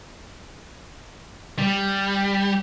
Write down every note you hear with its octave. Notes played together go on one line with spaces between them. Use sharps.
G3